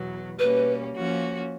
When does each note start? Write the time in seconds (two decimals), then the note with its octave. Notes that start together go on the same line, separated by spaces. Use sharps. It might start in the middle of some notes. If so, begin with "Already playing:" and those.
Already playing: E2 B2 F#3
0.39 B2 G3 A#3 C#4 B4
0.95 F3 A#3 C#4 F#4